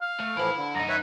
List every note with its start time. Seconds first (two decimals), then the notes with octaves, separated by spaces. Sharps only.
0.01 F5
0.20 A3
0.37 A2 E3 F3 E4 B5
0.57 D3
0.75 F#2 D#4 A#5
0.89 B4 C#5 E5